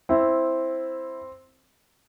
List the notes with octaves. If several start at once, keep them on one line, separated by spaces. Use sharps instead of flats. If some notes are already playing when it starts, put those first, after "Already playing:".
C4 E4